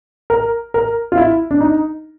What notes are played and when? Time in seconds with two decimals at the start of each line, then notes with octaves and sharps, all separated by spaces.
0.30 A#4
0.74 A#4
1.12 F4
1.17 E4
1.51 D4
1.60 D#4